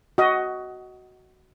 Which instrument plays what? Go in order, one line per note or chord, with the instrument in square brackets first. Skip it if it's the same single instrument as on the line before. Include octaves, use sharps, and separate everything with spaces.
[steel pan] F#4 D#5